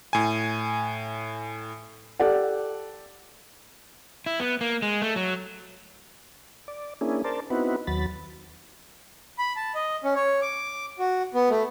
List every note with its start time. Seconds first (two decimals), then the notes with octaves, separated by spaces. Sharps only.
0.13 A2 G#5
2.20 G4 A4 D5 F#5
4.26 E4
4.40 B3
4.61 A#3
4.82 G#3
5.02 A3
5.16 F#3
6.68 D5
7.01 A#3 C#4 D4 E4 G#4
7.24 A#4 C5 D5 A5
7.50 B3 C4 D#4 E4 F#4 B4
7.87 D#2 F#3 B5 A6
9.39 B5
9.56 A5
9.75 D#5
10.04 C#4
10.16 C#5
10.42 D6
10.99 F#4
11.34 B3
11.50 A3